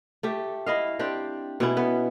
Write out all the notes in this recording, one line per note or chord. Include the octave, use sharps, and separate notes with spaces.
A3 G4
E4 D#5 F5
C4 D4 G4
B2 C#4 E4
B3